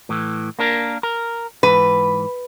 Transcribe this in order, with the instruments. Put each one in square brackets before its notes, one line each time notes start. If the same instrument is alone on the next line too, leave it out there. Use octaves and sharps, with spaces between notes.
[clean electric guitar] A2 E3
A#3 D4 A#4
A#4
[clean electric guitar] G#2 E3 [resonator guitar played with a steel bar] B4